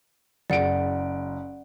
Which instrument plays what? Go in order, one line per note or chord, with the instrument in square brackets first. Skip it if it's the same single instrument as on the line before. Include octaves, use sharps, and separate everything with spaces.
[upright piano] F#1 D7 [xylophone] D5 F#5